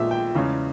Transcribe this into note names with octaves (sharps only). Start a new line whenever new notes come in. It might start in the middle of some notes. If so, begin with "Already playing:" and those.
Already playing: A#1 A#2 G#3 B3 E5
G5
E2 C#3 G#3 C#4